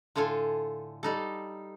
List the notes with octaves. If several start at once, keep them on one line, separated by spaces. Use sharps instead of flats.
A2 D3 F4 A4 G#5
G3 D#4 A4